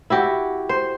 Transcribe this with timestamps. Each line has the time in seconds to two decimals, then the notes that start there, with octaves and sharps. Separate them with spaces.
0.10 E4 F#4 G4
0.69 C5